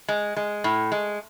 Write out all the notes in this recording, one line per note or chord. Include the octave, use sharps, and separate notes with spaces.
G#3
G#3
A2
G#3